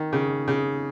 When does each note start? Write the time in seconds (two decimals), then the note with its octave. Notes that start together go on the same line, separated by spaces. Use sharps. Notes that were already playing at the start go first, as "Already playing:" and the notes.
Already playing: D#3
0.13 C#3
0.48 C#3